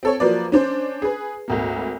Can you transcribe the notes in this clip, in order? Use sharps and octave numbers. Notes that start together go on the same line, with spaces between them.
C4 A4 C#5
F3 F#3 A#3 B4 D5
C#4 D4 C5
G#4 B4
G#1 D2 A#3